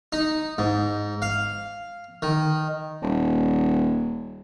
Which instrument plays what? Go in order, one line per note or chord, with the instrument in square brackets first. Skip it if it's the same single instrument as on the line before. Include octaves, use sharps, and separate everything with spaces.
[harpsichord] D#4
G#2
F5
D#3
[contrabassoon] D#1